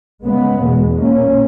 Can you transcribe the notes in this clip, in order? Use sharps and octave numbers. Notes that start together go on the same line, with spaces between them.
C#3 G#3 B3
E2 B2 G#3
A#2 A#3 C#4